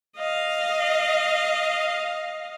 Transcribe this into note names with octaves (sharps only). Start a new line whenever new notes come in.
D#5 F5